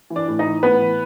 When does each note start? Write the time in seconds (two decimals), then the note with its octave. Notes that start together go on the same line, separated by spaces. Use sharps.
0.10 E3
0.16 D4 D5
0.28 A2
0.39 D#4 D#5
0.46 E3
0.63 A2 B3 B4
0.80 E3